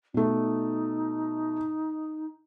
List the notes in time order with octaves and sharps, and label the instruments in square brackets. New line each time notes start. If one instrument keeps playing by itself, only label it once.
[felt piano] B2 A3 [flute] D#4